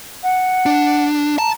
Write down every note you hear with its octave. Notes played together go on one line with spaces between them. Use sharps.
F#5
D4
A5 A#5